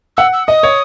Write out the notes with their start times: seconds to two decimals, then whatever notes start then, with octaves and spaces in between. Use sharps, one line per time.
0.17 F#5 E6
0.33 E6
0.47 D#5 D#6
0.63 C#5